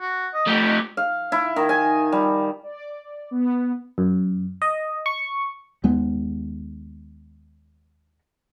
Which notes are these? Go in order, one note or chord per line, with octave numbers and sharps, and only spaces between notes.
F#4
D#5
C3 A3 G4
F5
E4
D#3
G#5
G3
D5
B3
F#2
D#5
C#6
D#2 G#3 B3